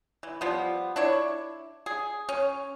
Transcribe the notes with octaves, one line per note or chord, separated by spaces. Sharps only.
E3
F3 G3 B3
D4 E4 C#5
G#4
C#4